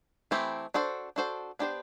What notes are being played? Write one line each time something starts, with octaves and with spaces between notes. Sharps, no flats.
E3 A3 C4 E4 G4
D4 F#4 A4 C5
D4 F#4 A4 C5
B3 D4 G4 C5